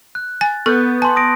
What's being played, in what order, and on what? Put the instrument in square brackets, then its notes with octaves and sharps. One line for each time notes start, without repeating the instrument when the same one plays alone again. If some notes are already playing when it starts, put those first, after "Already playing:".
[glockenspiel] F#6
[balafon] G#5 [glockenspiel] A6
[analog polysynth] B3 [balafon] A4 [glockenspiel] C#6 F#6 G6
[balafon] G#5 [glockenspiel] A5 C6
[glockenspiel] D#6 A#6 D7